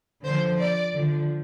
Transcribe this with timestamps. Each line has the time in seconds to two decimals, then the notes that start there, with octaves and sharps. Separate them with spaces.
0.24 D3 F3 C5
0.59 D5
0.94 D3 F3